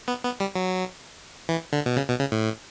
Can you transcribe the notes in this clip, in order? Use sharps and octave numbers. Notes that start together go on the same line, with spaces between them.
B3
B3
G3
F#3
E3
D3
B2
C#3
B2
C#3
A2